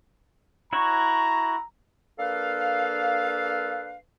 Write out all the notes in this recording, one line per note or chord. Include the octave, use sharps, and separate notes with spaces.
E4 F#4 C#5 A#5
A#3 D4 A4 B4 F5